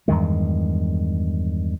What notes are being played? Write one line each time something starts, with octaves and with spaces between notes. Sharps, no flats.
E2 G2 D#3 G#3